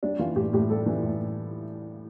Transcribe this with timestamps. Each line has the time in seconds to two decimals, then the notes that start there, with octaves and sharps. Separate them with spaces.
0.03 G3 D4
0.19 E3 F4
0.36 A2 G4
0.53 A2 G4
0.70 G3 A4
0.86 E3
1.03 A2